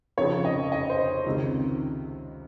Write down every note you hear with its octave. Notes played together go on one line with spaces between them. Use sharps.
F1 F2 C#3 F3 C#5
D#5
D#5
C5
C#2 C3 D#3